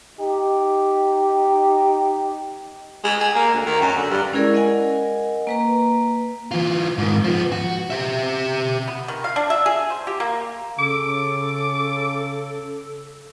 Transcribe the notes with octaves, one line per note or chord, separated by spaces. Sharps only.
D#4 G4
G#3
G#4
A#3
D2
D#3
F#2
D3
G2
G#3 C#4 E4 G#4 A#4 D5
A#4 D#5 F#5 G#5
A#3 B4 A#5
E3 F4
G#2 D#3
F3 B3
F#4
G4 E5
B3
D#3
F5
D4
E5
G#4
C5
G4
A#3
C#3 A4 D6